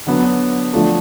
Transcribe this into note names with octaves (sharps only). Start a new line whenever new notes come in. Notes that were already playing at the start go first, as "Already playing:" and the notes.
D3 F#3 B3 D4
D3 F3 A3 D4